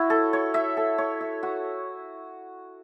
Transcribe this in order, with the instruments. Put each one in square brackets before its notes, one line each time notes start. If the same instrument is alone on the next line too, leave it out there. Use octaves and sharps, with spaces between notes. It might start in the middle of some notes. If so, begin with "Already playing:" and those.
Already playing: [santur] E4 F#4 C#5
A4
C#5
E5
A4
C#5
E5
F#4